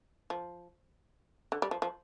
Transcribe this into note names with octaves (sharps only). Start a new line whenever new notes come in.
F3
D3
G3
F3
F3